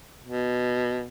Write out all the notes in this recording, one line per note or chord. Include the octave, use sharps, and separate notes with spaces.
B2